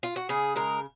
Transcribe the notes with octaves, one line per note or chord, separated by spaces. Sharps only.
F4
F#4
C#3 G#4
G#3 A#4